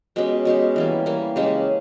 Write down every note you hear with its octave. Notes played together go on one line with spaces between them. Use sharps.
B2 G#3 C#4 G4
B2 G#3 C#4 G4
E3 G3 A#3
E3 G3 A#3
C#3 G#3 C#4 G4